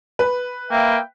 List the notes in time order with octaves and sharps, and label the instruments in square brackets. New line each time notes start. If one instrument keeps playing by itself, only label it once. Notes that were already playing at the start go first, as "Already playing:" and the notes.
[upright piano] B4
[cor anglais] A#3 [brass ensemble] E5 F5 G5